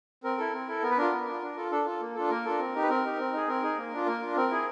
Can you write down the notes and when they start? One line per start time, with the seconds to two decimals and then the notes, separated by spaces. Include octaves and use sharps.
0.24 C4 A#4
0.38 E4 A4
0.53 C4
0.68 E4 A4
0.82 B3 A#4
0.90 B4
0.98 D4 F4 A#4
1.12 B3
1.27 D4 F4
1.42 D4
1.56 F4 A4
1.71 D4 A4
1.86 F4 A4
2.01 A#3
2.15 D4 F4 A4
2.30 A#3 A#4
2.45 D4 F4 A4
2.59 C4
2.75 D#4 G4
2.82 B4
2.89 C4 A#4
3.04 D#4 G4
3.19 C4
3.33 D#4 G#4
3.48 C4 A#4
3.62 D#4 G#4
3.77 A#3
3.92 D4 F4
4.06 A#3 A#4
4.21 D4 F4
4.37 C4 A#4
4.51 E4 G#4